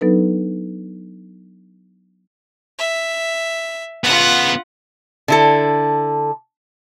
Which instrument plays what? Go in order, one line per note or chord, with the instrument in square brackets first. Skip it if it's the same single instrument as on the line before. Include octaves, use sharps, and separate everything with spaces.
[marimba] F#3 B3 D4 D#4 A4 B4
[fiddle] E5
[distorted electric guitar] C#3 B3 [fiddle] F4 F#5
[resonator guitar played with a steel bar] D3 E4 A4